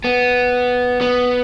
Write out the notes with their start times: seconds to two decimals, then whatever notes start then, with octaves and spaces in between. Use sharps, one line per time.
0.05 B3
1.02 B3